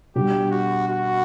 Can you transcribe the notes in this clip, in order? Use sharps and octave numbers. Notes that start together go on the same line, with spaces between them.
B2 G3 D4 G4
F#4
F#4